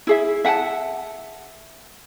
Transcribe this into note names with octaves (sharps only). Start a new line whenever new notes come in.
E4 G#4 E5
E5 F#5 G5 A5